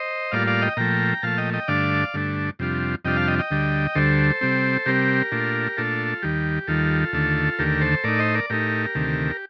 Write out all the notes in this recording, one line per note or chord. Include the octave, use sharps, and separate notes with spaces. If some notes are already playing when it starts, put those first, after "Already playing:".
Already playing: C5 D#5
A2 G3 A#3 F4 D5 F5
D5 F5
D#5 G5
A#2 F3 A3 G5 A#5
A#2 F3 A3 F5 A5
D#5 G5
D#5 G5
G2 D3 A3 D4 D5 F5
G2 D3 A3 D4
F2 C3 G3 D4 F4
F2 C3 G3 D4 F4 D#5 G5
F5 A5
D#5 G5
D#5 G5
D2 D3 G3
D2 D3 G3 A4 C5
C3 G3 C4
C3 G3 C4 G4 A#4
A#2 A3 D4 F4
A#2 A3 D4 F4 A4
D#2 D#3 G3 G4
D#2 D#3 G3 F4 A4
D#2 D3 A3
D#2 D3 A3 G4 A#4
A4 C5
A2 A3 D#4 A#4 D5
C5 D#5
A#4 D5
A2 A3 D#4 G4 A#4
D2 C3 D#3 A3